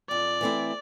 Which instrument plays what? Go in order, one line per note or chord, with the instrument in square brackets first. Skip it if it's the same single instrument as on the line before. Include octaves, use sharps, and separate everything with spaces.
[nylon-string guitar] F2 [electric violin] D5
[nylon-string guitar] E3 A3 C4 E4